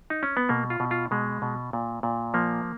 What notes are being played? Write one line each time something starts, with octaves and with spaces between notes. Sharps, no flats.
D#4
C#4
B3
B2 A#3
F4
B2
F4
B2 G#3
B2
A#2
A#2
F3 A#3